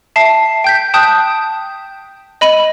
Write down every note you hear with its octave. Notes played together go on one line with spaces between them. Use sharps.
E5 A5 C7
G5 G6 B6
G5 A5 D#6 F#6 G6
D#5 B5 D#7 F#7